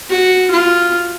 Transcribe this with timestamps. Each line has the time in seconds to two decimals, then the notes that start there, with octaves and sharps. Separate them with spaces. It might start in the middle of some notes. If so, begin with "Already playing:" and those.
0.10 F#4
0.51 F4